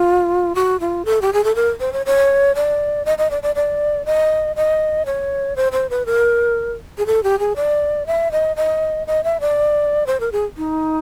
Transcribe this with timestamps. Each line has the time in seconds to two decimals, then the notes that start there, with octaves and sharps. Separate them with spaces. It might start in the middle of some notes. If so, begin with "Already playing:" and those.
Already playing: F4
0.55 F#4
0.80 F4
1.05 A4
1.22 G4
1.33 G#4
1.44 A4
1.55 A#4
1.80 C5
1.93 C#5
2.06 C#5
2.55 D5
3.05 D#5
3.18 D#5
3.31 D5
3.43 D5
3.55 D5
4.06 D#5
4.56 D#5
5.06 C#5
5.56 C5
5.72 C5
5.90 B4
6.06 A#4
6.98 G#4
7.06 A4
7.23 G4
7.39 G#4
7.56 D5
8.07 E5
8.32 D#5
8.56 D#5
9.07 D#5
9.24 E5
9.41 D5
10.07 C5
10.20 A#4
10.32 G#4
10.57 D#4